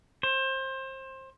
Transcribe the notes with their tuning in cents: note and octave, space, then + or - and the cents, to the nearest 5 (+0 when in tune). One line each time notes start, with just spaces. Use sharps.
C5 +25